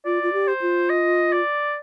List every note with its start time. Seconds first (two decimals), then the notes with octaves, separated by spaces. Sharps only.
0.05 F4 D5
0.23 F4
0.33 G4
0.48 C5
0.62 F4
0.90 D#5
1.33 D5